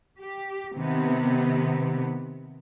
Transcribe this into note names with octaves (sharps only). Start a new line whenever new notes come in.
G4
C3 D#3 B3